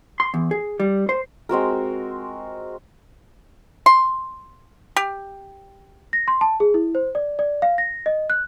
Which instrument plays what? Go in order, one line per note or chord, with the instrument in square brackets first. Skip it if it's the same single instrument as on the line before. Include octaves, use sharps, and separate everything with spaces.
[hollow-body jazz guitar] C6
E2
G#4
G3
C5
[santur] G#3 C4 F#4 A#4
[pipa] C6
G4
[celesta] A#6
C6
A5
G#4
E4
C5
D5
D5
F5
A#6
D#5
F#6